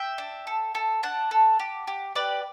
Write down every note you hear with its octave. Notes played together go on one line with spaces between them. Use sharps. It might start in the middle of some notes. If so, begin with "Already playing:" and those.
Already playing: E5 G5
D4
A4
A4
D4 F#5 A5
A4
G4
G4
G4 B4 D5